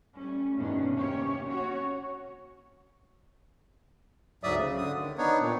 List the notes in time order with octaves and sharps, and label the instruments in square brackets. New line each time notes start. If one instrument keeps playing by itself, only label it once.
[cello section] G3 A3 C#4
E2 G2 B2 D#3 C#4 D4
C3 A#3 C#4 G4 C#5
C#4 F#4 C#5
[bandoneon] D2 G#2 F#3 D5 E5 D#6
C#3
D3 D#6
D#3
B3 D4 D#4 C#5
A#2 D#3